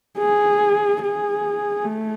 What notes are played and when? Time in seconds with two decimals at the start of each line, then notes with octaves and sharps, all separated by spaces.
0.19 G#4
1.02 G#4
1.85 A3